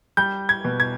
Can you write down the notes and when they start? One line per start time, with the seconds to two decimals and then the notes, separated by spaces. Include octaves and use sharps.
0.17 G3 G6
0.49 G#6
0.65 B2
0.80 G#6